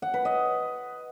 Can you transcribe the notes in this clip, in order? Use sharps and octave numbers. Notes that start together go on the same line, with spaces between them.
F#5
B4
D#5